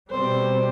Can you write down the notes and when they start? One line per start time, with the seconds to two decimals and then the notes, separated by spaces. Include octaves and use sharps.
0.10 B2 G3 C4 C5